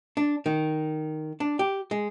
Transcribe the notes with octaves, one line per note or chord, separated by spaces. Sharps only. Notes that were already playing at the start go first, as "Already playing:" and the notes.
D4
D#3
D4
G4
G#3